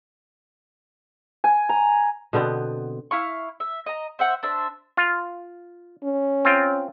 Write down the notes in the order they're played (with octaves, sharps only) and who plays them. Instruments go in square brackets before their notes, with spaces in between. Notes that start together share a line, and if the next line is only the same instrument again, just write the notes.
[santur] G#5
A#5
[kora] B2 D3 B3 C4
[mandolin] E4 F5 C#6
E5
D#5 A#5
C5 E5 F#5
D4 C5 E5
[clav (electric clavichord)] F4
[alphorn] C#4
[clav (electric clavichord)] C4 F4 G5